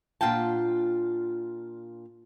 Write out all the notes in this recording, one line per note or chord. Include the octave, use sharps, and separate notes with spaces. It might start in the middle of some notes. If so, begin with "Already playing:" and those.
A#2 D4 F4 F#5 G5 A5